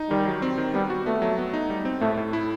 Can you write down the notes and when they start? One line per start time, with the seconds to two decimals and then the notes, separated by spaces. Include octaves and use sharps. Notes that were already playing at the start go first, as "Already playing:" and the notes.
Already playing: D#4
0.10 D#3 G3
0.26 F#3
0.42 C4
0.58 D#3
0.74 G3 B3
0.90 F#4
1.06 A3 B3
1.22 F#3
1.38 B3
1.54 D#4
1.70 G3
1.85 C4
2.01 A2 A3
2.17 A2
2.33 E4